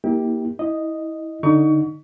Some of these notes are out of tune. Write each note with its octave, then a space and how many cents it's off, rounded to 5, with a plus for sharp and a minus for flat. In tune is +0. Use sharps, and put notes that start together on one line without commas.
A#3 +15 E4 -40 G4 +0
E4 -25 D#5 -5
D3 +0 D#4 +0 C#6 +30